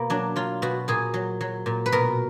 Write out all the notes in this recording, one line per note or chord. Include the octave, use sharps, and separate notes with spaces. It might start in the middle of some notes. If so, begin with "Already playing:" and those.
Already playing: B2 A#3
F#3 D4
F#3 F4
B2 F#4
A#2 G#4
F#3
F#3
A#2
B4
B2 A#4